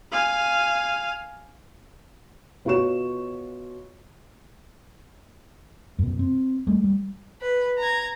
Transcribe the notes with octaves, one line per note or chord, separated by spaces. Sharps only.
F5 G#5
B2 F4 F#4 C#5 C#6 E7
F#2 B2
C4
G3 A3
G3
B4
A#5 G#6